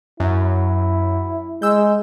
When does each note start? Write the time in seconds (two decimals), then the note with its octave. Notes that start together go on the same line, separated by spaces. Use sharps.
0.20 F#2 E4
1.62 G#3 E6 G6